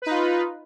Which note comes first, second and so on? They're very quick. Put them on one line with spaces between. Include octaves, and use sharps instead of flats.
B4 D#4 F4